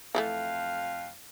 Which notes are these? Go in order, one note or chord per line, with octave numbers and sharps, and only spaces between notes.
F2 E3 G3 A3 F5